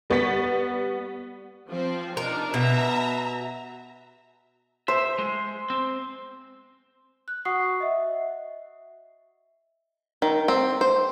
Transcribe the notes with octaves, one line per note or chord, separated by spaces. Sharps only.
G3 B3 C#6 A6 B6
F3 C4
D4 D#4 A#4
B2 E5 A#5
C5 E5
G#3
C4
F#6
F#4 F#5 C#6 D#6 C7
D#5 E5
D#3
C4
C5